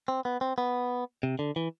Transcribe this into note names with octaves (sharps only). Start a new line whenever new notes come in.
C4
B3
C4
B3
C3
D3
E3